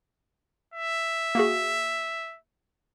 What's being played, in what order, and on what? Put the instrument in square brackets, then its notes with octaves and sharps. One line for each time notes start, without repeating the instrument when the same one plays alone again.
[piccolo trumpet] E5
[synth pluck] A#3 F#4 G#4